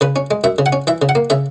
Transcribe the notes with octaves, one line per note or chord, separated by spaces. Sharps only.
C#3 B4
C#4
G#3
F#2 E5
C#3
F#5
C#4
E3 E5
C#3
F#5
A#3
C#3 E5